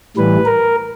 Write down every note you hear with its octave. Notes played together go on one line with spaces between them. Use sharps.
A2 E3 G3 B4
A#4